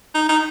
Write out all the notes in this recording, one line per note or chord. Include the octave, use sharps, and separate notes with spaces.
D#4
D#4